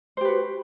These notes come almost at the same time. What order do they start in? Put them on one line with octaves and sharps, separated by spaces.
C5 G4 B4 F#4